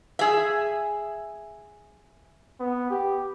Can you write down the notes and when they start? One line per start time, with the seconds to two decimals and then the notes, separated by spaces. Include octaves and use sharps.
0.19 G#4 E5
2.60 B3
2.90 G4